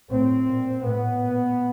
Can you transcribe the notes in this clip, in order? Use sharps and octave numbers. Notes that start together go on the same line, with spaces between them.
A2 C4
A#2
A2 B3
A#2